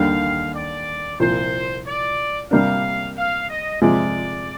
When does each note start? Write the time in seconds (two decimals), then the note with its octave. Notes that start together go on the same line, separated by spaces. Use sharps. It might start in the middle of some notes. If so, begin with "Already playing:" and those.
Already playing: D#2 D3 G3 F5
0.55 D5
1.20 C2 A#2 F3 C5
1.85 D5
2.51 C3 G3 A#3 D4 F5
3.16 F5
3.48 D#5
3.81 C3 F3 G#3 D5